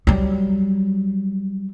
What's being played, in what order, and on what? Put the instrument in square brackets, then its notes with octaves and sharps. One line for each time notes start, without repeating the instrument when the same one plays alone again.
[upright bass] F#3 G3